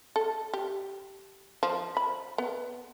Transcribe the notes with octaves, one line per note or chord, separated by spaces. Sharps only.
A4
G4
F3
B5
B3